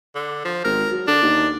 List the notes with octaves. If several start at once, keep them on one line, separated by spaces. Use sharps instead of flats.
D3
F3
G#1 A#4
F#3
D3 D4
D#2